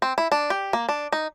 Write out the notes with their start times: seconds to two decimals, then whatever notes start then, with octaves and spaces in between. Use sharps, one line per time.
0.02 C4
0.18 E4
0.32 D4
0.50 G4
0.73 A#3
0.89 D4
1.12 D#4